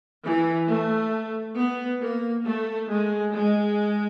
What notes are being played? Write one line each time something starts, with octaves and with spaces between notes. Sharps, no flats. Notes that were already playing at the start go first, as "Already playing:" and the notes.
E3
A3
B3
A#3
A3
G#3
G#3